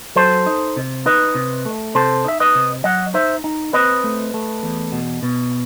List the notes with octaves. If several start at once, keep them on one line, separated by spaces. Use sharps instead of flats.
F#3 A4 C5
D#4
C3
D#4 B4 D#5
C3
A3
C3 A4 C5
D#4 E5
B4 D#5
C3
F#3 D#5 F#5
D#4 C5 E5
D#4
C4 B4 D#5
A3
A3
E2
B2
B2